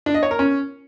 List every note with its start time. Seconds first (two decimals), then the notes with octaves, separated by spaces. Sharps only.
0.06 D4
0.14 D#5
0.23 C#5
0.31 A#4
0.39 C#4